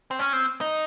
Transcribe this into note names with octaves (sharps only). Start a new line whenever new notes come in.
C4
C#4
C4
D#4